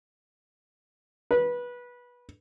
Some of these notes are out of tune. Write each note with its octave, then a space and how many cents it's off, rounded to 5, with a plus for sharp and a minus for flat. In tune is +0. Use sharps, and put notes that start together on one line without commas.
B4 -20